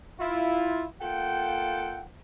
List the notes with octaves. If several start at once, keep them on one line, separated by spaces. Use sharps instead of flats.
E4 F4
A#3 F4 A4 F#5 G5